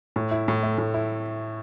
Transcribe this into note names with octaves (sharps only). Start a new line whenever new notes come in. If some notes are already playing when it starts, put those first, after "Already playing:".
A2
E4
A2
A3
A2
E4